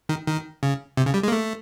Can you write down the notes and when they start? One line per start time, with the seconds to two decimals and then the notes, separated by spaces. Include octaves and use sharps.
0.09 D#3
0.27 D#3
0.63 C#3
0.97 C3
1.06 C#3
1.14 G3
1.23 G#3
1.28 A#3
1.32 A3